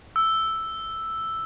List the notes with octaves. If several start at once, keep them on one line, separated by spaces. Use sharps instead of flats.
E6